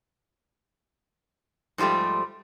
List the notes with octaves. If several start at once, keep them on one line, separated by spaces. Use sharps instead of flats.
G#2 F3 G3 A3 G4